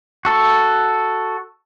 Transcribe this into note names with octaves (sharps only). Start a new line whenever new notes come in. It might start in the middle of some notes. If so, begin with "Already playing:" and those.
F#4 A4